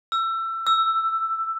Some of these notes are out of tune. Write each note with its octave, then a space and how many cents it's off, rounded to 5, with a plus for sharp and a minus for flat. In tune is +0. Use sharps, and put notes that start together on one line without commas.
E6 +25
E6 +10